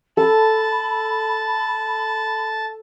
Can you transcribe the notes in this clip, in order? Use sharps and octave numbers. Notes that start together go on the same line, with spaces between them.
A4 A5 B5